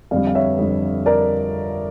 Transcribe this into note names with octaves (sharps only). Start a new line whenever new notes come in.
F2 D3 G3 D5 F5
F5
C#5 E5
F2 D3 G3
A#4 D5